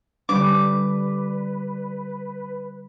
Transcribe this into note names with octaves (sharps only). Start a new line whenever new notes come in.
D3 G3 D4 B4 D6